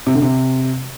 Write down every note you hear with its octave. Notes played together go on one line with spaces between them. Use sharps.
C3
D3
C3